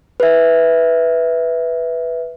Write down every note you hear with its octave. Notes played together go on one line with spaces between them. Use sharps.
B4 E5